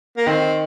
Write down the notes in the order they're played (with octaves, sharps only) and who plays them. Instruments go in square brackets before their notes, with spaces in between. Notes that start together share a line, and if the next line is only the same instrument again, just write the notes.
[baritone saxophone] A#3
[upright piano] D#3 [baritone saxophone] C4